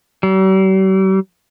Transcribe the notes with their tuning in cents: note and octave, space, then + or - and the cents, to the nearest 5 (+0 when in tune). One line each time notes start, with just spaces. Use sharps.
G3 -45